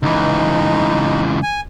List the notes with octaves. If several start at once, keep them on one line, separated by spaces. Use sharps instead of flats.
C#2 E3 D#4
G#5